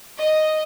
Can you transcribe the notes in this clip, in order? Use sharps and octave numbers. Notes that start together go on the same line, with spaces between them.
D#5